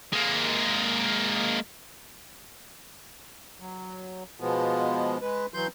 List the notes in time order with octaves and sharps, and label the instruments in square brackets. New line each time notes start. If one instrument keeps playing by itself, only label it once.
[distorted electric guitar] G#3 A#3
[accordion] F#3
B2 F3 G#3 B3
G#3 B4
E3 F#3 C6 G6